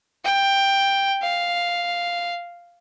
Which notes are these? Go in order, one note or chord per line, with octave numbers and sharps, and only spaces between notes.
G5
F5